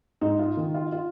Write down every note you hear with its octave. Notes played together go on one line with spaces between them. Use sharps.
G#2 D#4
F4
D#3
F4
F4